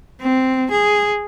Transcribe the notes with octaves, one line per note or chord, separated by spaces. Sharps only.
C4
G#4